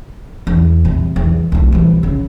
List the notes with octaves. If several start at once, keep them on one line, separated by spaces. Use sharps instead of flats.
E2
C3
E2
C2 A3
C3 E3
C#3